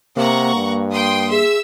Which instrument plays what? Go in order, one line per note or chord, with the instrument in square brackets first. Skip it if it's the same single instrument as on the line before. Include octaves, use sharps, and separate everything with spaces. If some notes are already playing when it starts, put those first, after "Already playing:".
[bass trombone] C3 [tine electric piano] A#3 [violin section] F#5 A#5 C#6
[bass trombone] G2
[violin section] G5 C6 D#6
[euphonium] G#4 [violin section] E5 E6